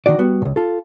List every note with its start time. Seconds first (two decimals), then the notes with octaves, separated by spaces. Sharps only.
0.06 D#3 D4 F#4 D5
0.18 G3 B3 F#4
0.42 C#2 A#2
0.56 F4 A4